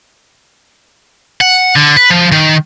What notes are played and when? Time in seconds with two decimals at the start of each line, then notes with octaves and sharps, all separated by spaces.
1.41 F#5
1.76 D3
1.97 B4
2.10 F3
2.32 D#3